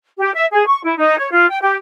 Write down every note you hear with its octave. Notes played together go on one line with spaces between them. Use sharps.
G4
E5
G#4
C#6
E4
D#4
C#5
F4
G5
G4